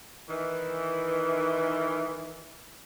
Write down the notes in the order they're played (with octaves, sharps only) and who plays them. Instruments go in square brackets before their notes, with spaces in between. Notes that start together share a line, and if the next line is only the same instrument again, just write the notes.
[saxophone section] D#3 E3